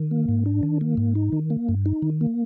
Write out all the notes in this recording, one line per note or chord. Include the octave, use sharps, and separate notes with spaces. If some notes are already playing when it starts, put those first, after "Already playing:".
Already playing: D#3
A#3
G#2
D4
D#3
A#3
G#2
D#4
D#3
A#3
G2
D#4
D#3
A#3